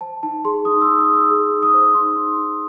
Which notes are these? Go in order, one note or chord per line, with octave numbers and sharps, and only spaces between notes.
C5 A5
D#4 A5
G#4 C6
D#4 D#6
E6
D#4
D#6
G#4 E6
G#4
D#4
D#6
C5
D#4 C6
D#4
D#4